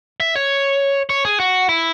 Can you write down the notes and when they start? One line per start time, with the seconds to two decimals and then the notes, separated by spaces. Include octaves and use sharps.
0.20 E5
0.36 C#5
1.10 C#5
1.25 G#4
1.40 F#4
1.69 E4